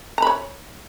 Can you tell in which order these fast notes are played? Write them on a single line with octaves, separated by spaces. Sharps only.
A#5 B5 C#5